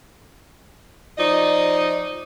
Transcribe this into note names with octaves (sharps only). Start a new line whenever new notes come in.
F3 D#4 D5 D#5